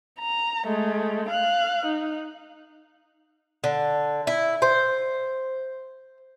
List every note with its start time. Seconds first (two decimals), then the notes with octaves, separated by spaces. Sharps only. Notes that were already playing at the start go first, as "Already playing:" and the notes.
0.20 A#5
0.65 G#3 A3
1.28 F5 F#6
1.86 D#4
3.64 D3
4.27 E4
4.62 C5